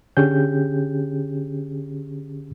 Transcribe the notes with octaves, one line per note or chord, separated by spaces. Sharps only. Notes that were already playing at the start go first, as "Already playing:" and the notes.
D3 C#4 G4 G#4 G6